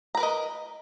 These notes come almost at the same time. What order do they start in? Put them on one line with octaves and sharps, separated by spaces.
A#5 B4 A#4 D#5